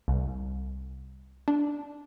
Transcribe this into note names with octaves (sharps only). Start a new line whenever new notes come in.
C2
D4